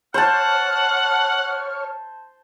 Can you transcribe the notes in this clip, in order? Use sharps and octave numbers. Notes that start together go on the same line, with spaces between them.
C5 C#5 F#5 A5 F6